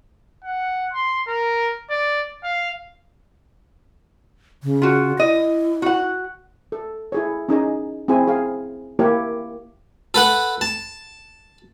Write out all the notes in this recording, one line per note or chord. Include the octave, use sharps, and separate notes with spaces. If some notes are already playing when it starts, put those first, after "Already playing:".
F#5
C6
A#4
D5
F5
C#3
F4 F#4
E4 D#5
F#4 F#5
A4
E4 G#4 C#5
C#4 D#4 G#4 D#5
C4 E4 G#4 G#5
G#4 F5
A#3 E4 G4 A#4 C#5
A4 B4 F#5
A5